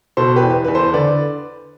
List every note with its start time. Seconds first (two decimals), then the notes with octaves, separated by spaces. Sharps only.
0.17 B2 A4 C5
0.36 G4 B4
0.43 E2
0.65 E2 B4
0.75 A4 C5
0.93 D3 B4 D5